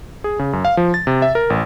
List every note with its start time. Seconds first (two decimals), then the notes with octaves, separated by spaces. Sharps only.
0.24 G#4
0.39 C#3
0.53 F#2
0.65 F5
0.77 F3
0.94 A6
1.07 C3
1.22 E5
1.35 A#4
1.50 A1